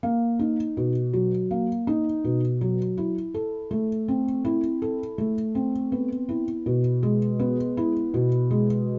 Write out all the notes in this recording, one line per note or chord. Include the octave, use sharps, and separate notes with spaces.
A#3
D#4
B2
F#3
A#3
D#4
B2
F#3
E4
A4
A3
C4
E4
A4
A3
C4
B3
E4
B2
G#3
B3
E4
B2
G#3